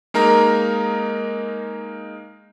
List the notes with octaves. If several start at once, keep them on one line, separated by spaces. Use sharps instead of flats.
G#3 A#3 D#4 A#4 A#5